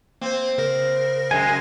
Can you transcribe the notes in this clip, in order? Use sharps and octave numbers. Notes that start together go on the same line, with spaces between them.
A#3 C4 C5
C#3 A#4 A#6
F#2 G#3 G#5